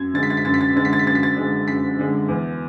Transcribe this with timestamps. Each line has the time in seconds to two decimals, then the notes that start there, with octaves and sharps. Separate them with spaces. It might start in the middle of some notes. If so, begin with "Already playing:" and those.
Already playing: F#2 G#6
0.14 D3 G#3 A6
0.23 B6
0.30 A6
0.37 B6
0.45 F#2 A6
0.54 B6
0.61 A6
0.68 B6
0.76 D3 G#3 A6
0.85 B6
0.93 A6
0.99 B6
1.07 F#2 A6
1.15 B6
1.23 A6
1.37 D3 G#3
1.68 F#2 B6
1.99 D3 G#3
2.28 E2